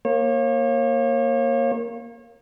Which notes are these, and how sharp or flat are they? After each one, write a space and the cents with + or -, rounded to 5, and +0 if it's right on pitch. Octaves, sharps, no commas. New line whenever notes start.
A#3 +0 C#5 -35